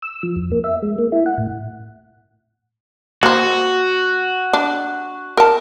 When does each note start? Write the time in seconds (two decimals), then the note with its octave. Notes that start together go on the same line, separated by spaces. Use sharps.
0.02 E6
0.23 F3
0.36 F2
0.52 A#3
0.64 E5
0.83 G#3
0.99 A#3
1.12 E4
1.26 F#5
1.38 A2
3.23 A#3 F#4 C5
4.53 D4
5.37 A#4 A5